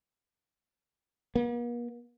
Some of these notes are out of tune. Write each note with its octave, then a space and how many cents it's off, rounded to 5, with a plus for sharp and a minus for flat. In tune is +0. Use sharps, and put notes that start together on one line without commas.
A#3 +45